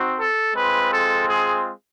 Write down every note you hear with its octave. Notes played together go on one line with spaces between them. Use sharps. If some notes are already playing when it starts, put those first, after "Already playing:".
Already playing: C4 D#4 F#4
A4
G#3 C4 F4 B4
A4
G#4